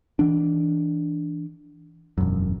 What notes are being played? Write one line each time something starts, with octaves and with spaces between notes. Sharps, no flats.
E3 D4
E1 F#2